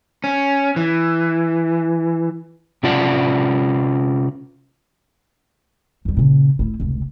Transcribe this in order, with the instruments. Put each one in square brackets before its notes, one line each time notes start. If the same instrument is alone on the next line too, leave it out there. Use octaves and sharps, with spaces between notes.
[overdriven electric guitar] C#4
E3
[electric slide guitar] C3 C#4 F4 D5 F#5 A5
[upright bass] E2 G3
A#2 C#3
A3 E4
F1 C#2